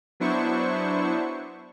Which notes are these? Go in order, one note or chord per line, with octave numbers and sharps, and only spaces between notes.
F#3 B3 D4 E4 C5 C#6